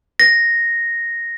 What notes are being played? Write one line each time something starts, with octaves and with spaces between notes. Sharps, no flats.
A#6